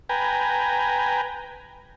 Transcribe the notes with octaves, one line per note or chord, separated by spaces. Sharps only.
B4 G5 G#5 A#5